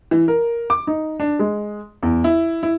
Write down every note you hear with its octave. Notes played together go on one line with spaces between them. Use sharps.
E3
A#4
D6
D#4
D4
G#3
E2
E4
E4